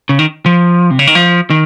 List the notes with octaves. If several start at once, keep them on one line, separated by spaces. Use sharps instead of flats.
C#3
D#3
F3
C3
C#3
D#3
F3
D#3